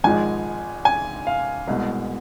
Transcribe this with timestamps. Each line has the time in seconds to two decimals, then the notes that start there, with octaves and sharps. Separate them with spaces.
0.04 G#1 G#2 F3 G#3 G#5
0.85 G#5
1.27 F5
1.68 C2 B2 G#3